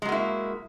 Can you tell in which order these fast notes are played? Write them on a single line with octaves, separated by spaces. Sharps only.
G#3 F#3 A#3 E4